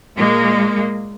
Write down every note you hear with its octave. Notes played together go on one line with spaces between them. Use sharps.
A#2 G#3 A#3